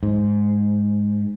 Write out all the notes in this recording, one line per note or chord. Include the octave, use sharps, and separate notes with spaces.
G#2